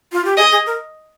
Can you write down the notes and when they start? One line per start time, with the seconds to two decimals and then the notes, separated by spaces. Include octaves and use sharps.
0.12 F4
0.25 G4
0.37 G#4 D#5
0.51 G#4
0.66 A#4